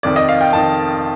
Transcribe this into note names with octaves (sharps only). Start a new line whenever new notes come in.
F1 F2 D#3 D5
D#5
F5
G5
F1 F2 D#3 A5